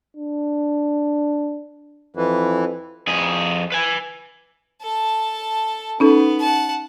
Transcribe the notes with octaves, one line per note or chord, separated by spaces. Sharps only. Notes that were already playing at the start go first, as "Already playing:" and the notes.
D4
F2 E3
F2 G#4
B4 G#5
A4 A5
B3 C#4 D#4 A4
F#5 A5